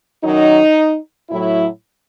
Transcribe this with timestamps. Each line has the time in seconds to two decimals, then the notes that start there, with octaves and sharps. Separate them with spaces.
0.23 F#2 D#3 F#3 D#4
1.30 A2 F#3 E4